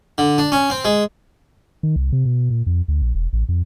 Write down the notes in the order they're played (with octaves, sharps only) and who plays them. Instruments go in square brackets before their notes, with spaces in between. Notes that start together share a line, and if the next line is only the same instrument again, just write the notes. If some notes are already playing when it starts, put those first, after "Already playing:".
[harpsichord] D3
D4
C#4
C4
G#3
[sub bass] D#3
C2
C3
B2
A#2
F2
D2
A#1
E1
A1
F2